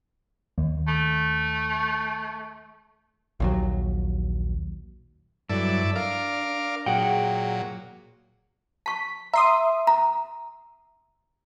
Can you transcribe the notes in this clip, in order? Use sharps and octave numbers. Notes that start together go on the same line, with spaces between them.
D#2
A3
A#1 D#2 F#3
G2 F#3 E4 A4 D5
D4 A#4 F5 D6
A#2 F#3 G#4 F#5 G5
A5 C#6 B6
E5 A#5 C6 D#6
A#5